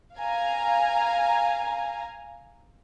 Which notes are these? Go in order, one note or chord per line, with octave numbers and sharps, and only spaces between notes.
F5 G#5 A#5